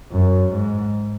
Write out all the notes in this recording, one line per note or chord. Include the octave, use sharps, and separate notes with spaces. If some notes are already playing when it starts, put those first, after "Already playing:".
F#2
G#2